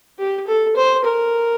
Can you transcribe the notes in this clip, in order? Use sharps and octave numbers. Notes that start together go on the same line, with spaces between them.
G4
A4
C5
A#4